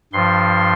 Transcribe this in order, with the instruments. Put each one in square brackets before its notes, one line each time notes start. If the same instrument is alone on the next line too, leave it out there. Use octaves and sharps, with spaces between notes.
[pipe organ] G2 F3 C6